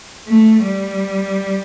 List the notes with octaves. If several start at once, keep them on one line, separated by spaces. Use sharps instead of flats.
A3
G3